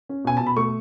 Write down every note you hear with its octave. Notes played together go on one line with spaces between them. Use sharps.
C#4
B2 G#5
B2 A5
B5
A3 C#6